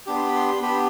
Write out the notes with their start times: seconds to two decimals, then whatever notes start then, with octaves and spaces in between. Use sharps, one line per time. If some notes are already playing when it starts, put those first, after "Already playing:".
0.06 B3 D4 G4 D6
0.16 C6
0.26 B5
0.36 C6
0.62 B3 D4 G4 B5